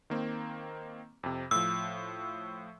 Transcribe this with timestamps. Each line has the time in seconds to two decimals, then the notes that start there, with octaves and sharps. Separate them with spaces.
0.10 D#3 A#3 C4
1.23 F2 C3
1.51 A2 F3 E6